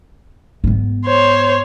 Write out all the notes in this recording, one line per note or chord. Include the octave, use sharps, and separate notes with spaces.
G#2 B3
C5 C#5